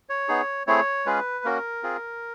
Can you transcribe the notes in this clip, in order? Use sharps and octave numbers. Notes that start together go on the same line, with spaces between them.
C#5
B3 D#4 G#4
A3 C4 E4 G#4 C#5
G#3 C#4 F4 G#4 B4
A#3 C#4 F#4 A#4
C4 F4 G#4